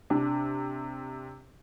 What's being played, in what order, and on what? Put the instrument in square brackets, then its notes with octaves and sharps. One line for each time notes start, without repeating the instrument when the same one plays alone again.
[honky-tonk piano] C3 [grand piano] D4